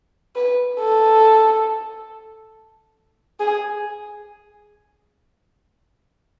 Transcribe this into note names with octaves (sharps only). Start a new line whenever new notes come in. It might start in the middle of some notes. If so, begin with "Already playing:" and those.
B4
A4
G#4